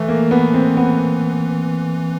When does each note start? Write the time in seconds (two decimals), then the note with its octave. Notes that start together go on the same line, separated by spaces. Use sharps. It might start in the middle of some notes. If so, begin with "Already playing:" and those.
Already playing: E3 A3
0.08 A#3
0.31 B3
0.54 C4
0.77 B3